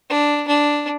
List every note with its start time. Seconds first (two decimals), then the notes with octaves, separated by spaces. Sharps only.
0.09 D4
0.48 D4